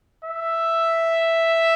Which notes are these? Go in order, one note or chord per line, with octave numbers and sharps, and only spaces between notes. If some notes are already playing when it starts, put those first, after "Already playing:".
E5